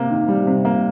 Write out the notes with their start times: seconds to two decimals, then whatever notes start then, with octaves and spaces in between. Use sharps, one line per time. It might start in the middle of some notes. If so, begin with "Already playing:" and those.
Already playing: C3 A#3
0.10 D#3
0.29 G3
0.47 C3
0.65 A#3